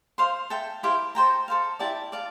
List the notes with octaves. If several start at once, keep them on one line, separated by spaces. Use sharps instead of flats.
C5 F5 C6
A4 E5 G5
E4 G4 C5 F5
A4 C5 G5 A#5
A4 C5 F5
E4 G4 D5 A5
D5 F5 A5